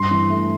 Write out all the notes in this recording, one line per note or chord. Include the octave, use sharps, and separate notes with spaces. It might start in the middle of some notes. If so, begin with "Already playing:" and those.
Already playing: G2 C6
E3
A3